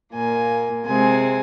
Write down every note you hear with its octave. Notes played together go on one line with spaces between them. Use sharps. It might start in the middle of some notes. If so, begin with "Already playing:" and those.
A#2 A#3 G#5
C3 G#3 C4 G#5